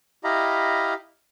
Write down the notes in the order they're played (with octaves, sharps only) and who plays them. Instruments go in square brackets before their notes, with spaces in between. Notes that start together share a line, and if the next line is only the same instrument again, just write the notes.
[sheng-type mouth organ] E4 G4 D#5 F5 A#5 B5